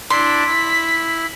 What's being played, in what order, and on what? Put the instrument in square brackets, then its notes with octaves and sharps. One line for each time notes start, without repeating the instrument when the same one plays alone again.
[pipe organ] D4 E4 D5 [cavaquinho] C6 [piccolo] B6
[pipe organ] E4